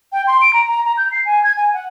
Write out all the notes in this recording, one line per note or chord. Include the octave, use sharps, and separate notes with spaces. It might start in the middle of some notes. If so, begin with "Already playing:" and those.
G5
C6
D7
A#5
A#5
A#5
G6
C7
G#5
G#6
G#5
F#5